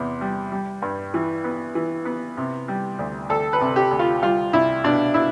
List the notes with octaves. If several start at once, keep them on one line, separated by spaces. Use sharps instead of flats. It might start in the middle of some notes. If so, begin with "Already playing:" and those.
Already playing: E2 C3
G3
G3
G2
E3
B3
E3
B3
C3
G3
D2
D2 A4
B4
C3
G4
D2
F4
G3 F4
C2 E4
B2 D4
B2 E4